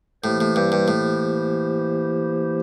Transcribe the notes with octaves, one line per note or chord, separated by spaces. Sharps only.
A2 E3 A#3 E4 G4 C5
A2
G2
G2
A2